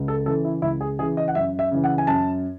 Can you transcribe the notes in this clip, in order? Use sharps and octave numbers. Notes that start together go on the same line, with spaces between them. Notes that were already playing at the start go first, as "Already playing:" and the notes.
Already playing: C#2
A4
C#3 E3 A4
E4
C#2 E4
G#4
C#3 E3 G#4
D#5
F#5
F#2 E5
E5
C#3 E3
F#5
G#5
F#2 A5